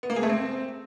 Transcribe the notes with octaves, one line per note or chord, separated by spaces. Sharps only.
B3
A#3
G#4
A3
C4